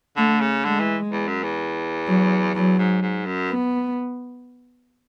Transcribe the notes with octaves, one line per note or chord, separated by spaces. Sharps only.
D3 A3
C#3
D3 G#3
E3
E2
F#2
E2
F#3
E2 F#3
G#2
G#2
F#2
B3